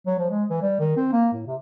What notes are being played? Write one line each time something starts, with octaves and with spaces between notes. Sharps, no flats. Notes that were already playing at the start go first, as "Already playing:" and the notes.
F#3
F3
G#3
E3
G3
D#3
C4
A#3
A2
C3